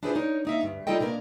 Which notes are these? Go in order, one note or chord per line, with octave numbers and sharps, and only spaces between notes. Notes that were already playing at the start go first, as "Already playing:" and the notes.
D4 E4 F4 G#4 B4 C5
D#4 A#4 C#5
A#3 D#4 E5
D2 G2
G3 D#4 F4 A4 D#5 G5
B2 A#3 D4 A#4